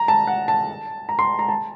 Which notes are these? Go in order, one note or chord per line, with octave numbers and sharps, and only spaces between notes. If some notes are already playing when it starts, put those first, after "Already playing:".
Already playing: A#5
A5
F#5
A5
A#5
C6
A#5
A5